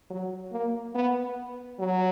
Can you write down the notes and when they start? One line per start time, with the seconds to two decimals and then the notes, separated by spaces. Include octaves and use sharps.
0.10 F#3
0.52 A#3
0.95 B3
1.80 F#3